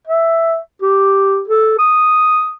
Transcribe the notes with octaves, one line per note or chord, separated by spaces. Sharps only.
E5
G4
A4
D#6